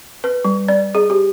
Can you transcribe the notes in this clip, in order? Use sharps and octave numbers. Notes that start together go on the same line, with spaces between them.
B4
G3
D5
G#4
G4